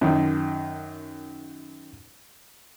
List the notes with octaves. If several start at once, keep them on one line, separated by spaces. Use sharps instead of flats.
F#2 D#3